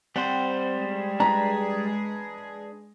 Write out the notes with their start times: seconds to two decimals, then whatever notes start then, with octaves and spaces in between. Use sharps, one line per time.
0.16 G3 C4 C5 F#5 G5
0.75 G#3 G#4
1.20 D4 B4 A#5 B5